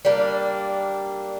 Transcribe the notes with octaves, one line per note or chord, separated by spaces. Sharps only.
G3 A#3 D4